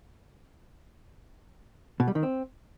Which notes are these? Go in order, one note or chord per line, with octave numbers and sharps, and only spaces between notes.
B2
G3
D#3
C4